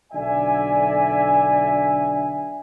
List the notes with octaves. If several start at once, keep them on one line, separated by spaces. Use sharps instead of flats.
B1 D3 D5 E5 G#5